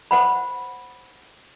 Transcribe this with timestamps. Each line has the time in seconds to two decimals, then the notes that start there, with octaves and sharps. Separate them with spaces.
0.11 C5 F#5 B5